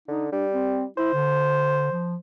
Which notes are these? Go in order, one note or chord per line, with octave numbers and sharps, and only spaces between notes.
D3 D#4
G3 D4
C4
E4 C5
D3
F3